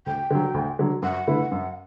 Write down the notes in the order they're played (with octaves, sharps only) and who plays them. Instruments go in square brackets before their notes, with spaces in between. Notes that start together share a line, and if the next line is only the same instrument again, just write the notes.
[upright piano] D2 [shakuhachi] G5
[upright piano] D3 F#3
D2
D3 F#3
[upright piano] F#2 [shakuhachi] F#5
[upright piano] D3 A3 E4 B4
F#2